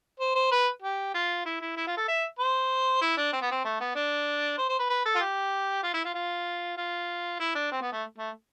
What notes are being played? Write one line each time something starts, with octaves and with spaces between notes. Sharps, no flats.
C5
C5
B4
G4
F4
E4
E4
E4
F4
A4
E5
C5
E4
D4
C4
B3
C4
A3
B3
D4
C5
C5
B4
B4
A4
F4
G4
F4
E4
F4
F4
F4
E4
D4
C4
B3
A3
A3